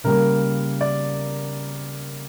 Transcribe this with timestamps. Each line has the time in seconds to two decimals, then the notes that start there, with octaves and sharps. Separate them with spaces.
0.04 C#3 G3 A#3 A#4
0.81 D5